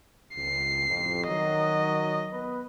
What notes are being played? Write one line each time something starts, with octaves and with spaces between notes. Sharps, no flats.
C#2 C7
A1 F2
D#3 F#3 D#5
B3 B4